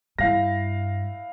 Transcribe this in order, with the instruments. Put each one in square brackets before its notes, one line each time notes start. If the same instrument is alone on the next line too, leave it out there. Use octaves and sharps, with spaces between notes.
[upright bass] G2 [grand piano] E4 F5 A#6